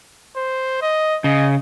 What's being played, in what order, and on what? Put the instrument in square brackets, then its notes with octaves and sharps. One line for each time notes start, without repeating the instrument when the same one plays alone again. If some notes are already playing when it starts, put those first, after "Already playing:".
[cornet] C5
D#5
[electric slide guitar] C#3 [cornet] D#5